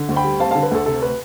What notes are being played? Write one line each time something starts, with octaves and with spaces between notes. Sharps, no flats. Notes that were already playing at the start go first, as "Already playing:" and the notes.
Already playing: D3
D2
G5 B5
G3
C4 F5 A5
D3 F5 A5
B4
D2 A4
C3 A4
B4